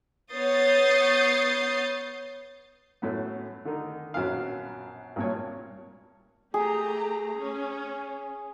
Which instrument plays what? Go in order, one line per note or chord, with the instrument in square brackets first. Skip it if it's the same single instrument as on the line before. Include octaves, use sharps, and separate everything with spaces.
[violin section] B3 C#5 D#6 G6 A6 C7
[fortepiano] F#2 A2 A3 B3
D3 D#3 D#4
A#1 F#2 B2 B3 F5
G#1 G2 A#2 C#5
[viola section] A3 G4 A#5 [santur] G#4
[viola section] C#4